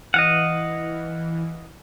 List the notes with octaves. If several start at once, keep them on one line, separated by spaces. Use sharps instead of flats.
E3 D#5 F5 F#5